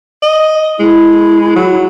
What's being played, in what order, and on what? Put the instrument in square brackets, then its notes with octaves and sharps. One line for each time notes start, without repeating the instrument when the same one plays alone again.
[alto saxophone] D#5
[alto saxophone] G#3 [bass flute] E4
[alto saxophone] F#3